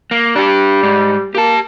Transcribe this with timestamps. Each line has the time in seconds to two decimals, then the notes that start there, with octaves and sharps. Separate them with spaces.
0.11 A#3
0.36 G3 D4 G4
0.83 G#2
1.35 A#3 G4 A5